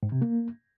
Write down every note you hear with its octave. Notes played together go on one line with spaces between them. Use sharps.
G#2
C3
A#3